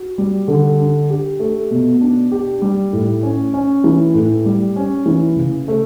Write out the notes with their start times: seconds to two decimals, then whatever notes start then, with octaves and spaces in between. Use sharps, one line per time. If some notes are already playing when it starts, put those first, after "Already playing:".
Already playing: F#4
0.18 G3
0.48 D3
0.80 D4
1.10 G4
1.40 A3
1.71 B2
2.01 D4
2.32 G4
2.62 G3
2.93 A2
3.23 C#4
3.54 C#4
3.84 E3
4.14 A2
4.46 G3
4.76 C#4
5.06 E3
5.36 C#3
5.68 A3